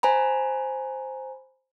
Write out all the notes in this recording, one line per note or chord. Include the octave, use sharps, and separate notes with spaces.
C5 G#5 A#5 B5